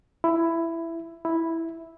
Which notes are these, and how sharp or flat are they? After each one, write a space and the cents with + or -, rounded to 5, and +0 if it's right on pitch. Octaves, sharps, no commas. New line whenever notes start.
E4 +10
E4 -5